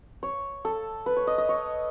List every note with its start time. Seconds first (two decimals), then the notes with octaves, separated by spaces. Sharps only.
0.23 C#5
0.65 A4
1.06 B4
1.17 C#5
1.27 D#5
1.38 D#5
1.49 C#5